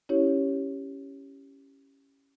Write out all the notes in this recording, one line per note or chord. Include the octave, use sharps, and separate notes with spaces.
C#4 E4 G4 C#5